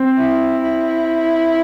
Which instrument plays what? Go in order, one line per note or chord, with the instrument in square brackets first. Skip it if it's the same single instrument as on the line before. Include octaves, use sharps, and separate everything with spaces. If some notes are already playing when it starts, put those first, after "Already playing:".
Already playing: [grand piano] C4
[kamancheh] E4
E4